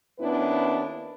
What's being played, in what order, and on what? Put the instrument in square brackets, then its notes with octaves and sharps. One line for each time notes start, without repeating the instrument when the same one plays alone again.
[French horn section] D#2 B3 C#4 D4 E4 B4